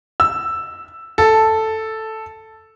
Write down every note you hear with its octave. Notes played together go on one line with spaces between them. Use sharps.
E6
A4